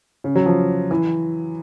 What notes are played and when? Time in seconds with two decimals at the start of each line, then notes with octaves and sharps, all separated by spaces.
0.24 C#3
0.36 F#3
0.46 F3
0.91 E3